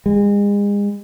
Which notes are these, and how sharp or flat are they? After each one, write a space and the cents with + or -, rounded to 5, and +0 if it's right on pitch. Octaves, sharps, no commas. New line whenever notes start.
G#3 -35